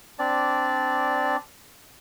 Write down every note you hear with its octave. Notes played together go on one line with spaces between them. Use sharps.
C4 D4 D5